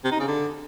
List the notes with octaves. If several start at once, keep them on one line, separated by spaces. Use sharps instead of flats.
C3
D#4
C#3
D3